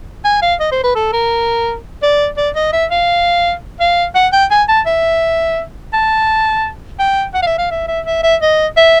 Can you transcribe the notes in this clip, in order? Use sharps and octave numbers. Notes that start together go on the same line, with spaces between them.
G#5
F5
D#5
C5
B4
A4
A#4
D5
D5
D#5
E5
F5
F5
F#5
G5
G#5
A5
E5
A5
G5
F#5
F5
E5
F5
E5
E5
E5
E5
D#5
E5